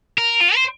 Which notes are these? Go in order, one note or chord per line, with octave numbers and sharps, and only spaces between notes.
A#4
F4
C5